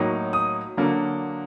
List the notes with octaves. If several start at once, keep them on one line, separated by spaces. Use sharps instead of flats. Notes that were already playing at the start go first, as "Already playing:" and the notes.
Already playing: A2 F#3 A#3 D#4
D#6
D3 F#3 A#3